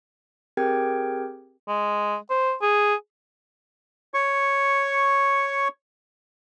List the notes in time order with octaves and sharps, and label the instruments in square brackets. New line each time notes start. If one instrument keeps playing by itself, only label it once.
[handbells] C4 G4 G#4 A#4 G5 G#6
[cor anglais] G#3
C5
G#4
[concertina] C#5 C#6